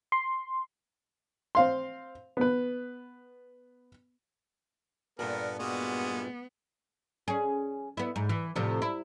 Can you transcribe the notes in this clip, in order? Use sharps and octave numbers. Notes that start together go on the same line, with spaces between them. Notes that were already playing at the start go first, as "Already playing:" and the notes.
C6
C4 F5 C6
B3 B4
G2 A#2 B3 A4 A#4
G3 G#3 B3 F#4 D#6
C#4 G#4
B3 E4
G#2
E3
A2 C3 F3
E4